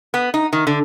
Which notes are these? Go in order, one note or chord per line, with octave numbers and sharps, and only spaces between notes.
B3
D#4
D#3
D3